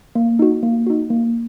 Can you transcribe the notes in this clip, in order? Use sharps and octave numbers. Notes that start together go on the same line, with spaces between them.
A#3
D#4 F#4
A#3
D#4 F#4
A#3